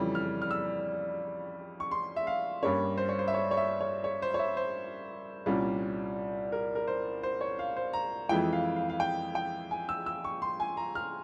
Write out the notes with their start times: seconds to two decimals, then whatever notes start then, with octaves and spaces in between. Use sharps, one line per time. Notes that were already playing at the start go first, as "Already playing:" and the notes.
Already playing: F2 C#3 E3 G3 C#4
0.15 F6
0.42 F6
0.51 E6
1.80 C#6
1.91 C6
2.16 E5
2.27 F5
2.62 G2 G3 A#3 C#4 C#5
2.97 C5
3.09 C#5
3.19 C5
3.28 E5
3.34 C#5
3.51 C#5
3.57 E5
3.81 C#5
4.04 C#5
4.22 C5
4.34 C#5
4.39 E5
4.57 C5
5.46 C2 A#2 G3 C#4
6.52 A#4
6.75 A#4
6.87 C5
7.23 C5
7.41 C#5
7.59 F5
7.77 C5
7.93 A#5
8.29 F2 E3 G#3 E4 G5
8.53 F5
8.76 F5
8.89 F5
9.00 G5
9.35 G5
9.71 G#5
9.89 E6
10.06 E6
10.24 C#6
10.42 C6
10.60 G#5
10.77 A#5
10.95 F6